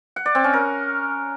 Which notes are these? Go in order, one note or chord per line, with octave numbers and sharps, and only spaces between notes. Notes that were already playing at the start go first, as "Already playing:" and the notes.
F#5
D5
C4
C#4
A#4